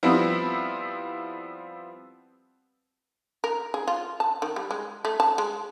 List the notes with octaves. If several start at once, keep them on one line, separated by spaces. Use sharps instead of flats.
F3 G3 B3 C4 E4
A#4
G#4
F4
A5
D#3
G3
G#3
A3
A5
G#3